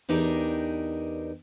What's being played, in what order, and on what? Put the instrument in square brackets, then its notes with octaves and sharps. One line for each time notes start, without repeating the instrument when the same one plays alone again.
[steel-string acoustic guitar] E2 D4 D#4 G4 A#4